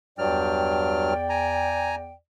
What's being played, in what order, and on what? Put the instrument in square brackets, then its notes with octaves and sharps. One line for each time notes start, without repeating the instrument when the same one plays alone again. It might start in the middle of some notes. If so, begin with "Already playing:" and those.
[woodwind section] E2 D5 G5 [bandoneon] G2 F#3 F6
[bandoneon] G#5 A#5